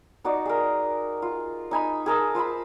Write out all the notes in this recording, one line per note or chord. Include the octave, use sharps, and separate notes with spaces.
D#4 F#4 D5
G#4 A#4
F4
D#4 G#5 B5
G#4 A#4 A5 E6
F4 C5 A5 B5